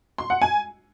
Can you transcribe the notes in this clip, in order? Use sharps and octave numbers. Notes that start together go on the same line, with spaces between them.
C6
F#5
G#5